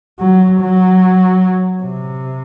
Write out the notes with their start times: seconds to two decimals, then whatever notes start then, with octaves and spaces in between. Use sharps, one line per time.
0.20 F#3
0.60 F#3
1.83 C3